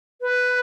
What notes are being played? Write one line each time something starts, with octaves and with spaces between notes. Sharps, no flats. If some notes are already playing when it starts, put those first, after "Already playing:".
B4